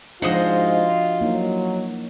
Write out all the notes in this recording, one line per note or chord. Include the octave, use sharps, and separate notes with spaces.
G#2 F3 D4 F4 F#4 C5 D#5
F#3 A#3 D#4 E4